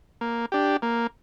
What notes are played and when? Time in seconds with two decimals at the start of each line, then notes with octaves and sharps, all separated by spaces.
0.21 A#3
0.52 D4 G4
0.82 A#3